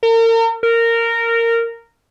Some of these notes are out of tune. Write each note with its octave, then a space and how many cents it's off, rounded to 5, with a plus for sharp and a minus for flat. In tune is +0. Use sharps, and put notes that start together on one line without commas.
A#4 -40
A#4 -15